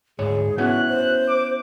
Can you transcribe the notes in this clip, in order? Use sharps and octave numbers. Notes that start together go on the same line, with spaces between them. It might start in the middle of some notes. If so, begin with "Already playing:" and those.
D2 G#2 G#4 C#5
B3 C#4 E4 F#4 F#6
C5
D6